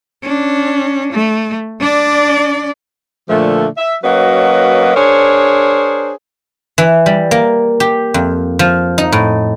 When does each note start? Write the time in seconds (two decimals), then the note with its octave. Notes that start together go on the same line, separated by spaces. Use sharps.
0.23 C#4 D4
1.13 A3
1.80 D4 D5
3.29 A#2 D3 F3 A3
3.77 E5
4.04 F#3 A#3 C#4 F#4 B4 D#5
4.95 D4 G#4 A#4 C5 C#5
6.78 E3
7.06 G3
7.31 A#3
7.80 G4
8.14 F2
8.59 F3
8.98 D#4
9.12 A2